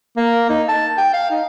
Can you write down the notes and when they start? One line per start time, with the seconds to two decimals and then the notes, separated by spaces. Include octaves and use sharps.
0.17 A#3
0.50 D#4
0.69 A5
0.98 G5
1.13 F5
1.31 D#4